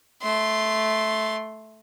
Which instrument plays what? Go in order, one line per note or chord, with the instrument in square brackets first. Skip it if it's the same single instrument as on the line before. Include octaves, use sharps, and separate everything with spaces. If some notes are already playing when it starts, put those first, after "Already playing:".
[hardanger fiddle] A3 C6